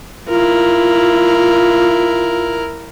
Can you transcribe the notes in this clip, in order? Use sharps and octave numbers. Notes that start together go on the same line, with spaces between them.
E4 F4 A#4